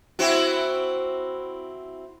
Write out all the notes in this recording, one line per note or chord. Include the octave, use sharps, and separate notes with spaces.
C4 E4 F#4